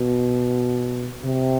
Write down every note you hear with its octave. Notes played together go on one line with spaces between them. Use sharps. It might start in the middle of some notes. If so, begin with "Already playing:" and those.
Already playing: B2
C3